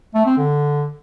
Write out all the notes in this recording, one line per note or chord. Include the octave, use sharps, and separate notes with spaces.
A3
C4
D3